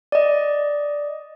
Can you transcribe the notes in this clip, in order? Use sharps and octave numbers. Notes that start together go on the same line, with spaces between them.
D5 D#5